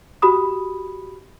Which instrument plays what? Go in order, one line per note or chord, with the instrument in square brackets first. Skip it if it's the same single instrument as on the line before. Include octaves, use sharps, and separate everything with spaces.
[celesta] F#4 G4 B5 D#6